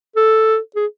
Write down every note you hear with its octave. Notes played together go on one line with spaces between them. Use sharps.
A4
G#4